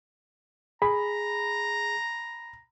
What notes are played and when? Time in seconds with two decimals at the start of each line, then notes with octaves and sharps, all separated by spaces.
0.82 G#4 A#5 B5